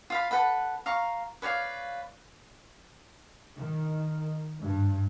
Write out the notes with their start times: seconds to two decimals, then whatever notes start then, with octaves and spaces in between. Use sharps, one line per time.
0.10 F4 F5 B5
0.31 A4 B4 F#5 B5
0.86 F5 A#5 C#6
1.42 B4 C#5 D5 F5
3.57 D#3
4.61 G2